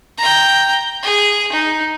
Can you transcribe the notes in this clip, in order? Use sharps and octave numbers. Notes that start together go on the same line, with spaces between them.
G5 A#5
G#4
D#4